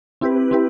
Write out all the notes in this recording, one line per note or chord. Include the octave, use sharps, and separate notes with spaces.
C4 E4 G4 B4
C4 E4 G4 B4